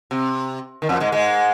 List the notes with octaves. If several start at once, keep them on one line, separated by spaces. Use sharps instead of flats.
C3
D#3
F2 F3
G#2 G#3
G#2 G#3